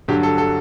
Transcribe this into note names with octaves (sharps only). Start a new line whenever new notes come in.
G2 D3 F#3 G4
A4
A4